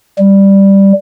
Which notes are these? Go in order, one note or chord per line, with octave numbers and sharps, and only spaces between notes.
G3